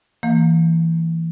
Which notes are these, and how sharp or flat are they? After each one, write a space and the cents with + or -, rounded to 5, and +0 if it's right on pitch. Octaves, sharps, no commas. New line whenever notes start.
E3 +0 A#3 -15 F5 +40